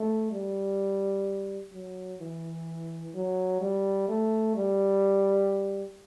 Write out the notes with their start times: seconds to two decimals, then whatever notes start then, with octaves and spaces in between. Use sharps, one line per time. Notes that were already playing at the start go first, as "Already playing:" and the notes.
Already playing: A3
0.31 G3
1.73 F#3
2.20 E3
3.15 F#3
3.61 G3
4.08 A3
4.56 G3